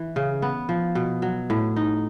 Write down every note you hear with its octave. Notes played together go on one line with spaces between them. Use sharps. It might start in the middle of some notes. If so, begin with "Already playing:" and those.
Already playing: E3
C#3
B3
F3
B2
F#3
A2
D#4